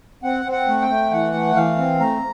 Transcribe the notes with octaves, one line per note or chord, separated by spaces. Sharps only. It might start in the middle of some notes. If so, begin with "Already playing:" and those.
C4 F#5
C4
F#5
A3
G5
A3
E3 F#5
A3
E3 F5
C4
A3 A#5